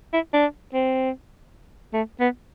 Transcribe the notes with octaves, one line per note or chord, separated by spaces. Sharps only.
E4
D4
C4
A3
B3